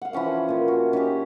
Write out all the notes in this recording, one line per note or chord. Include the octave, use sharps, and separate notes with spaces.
F5 F#5
E3 F3 C#4 F#5
A#2 F4
F#4
C#4 D#4 G4